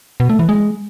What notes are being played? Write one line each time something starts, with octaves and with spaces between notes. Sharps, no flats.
B2
A3
E3
G#3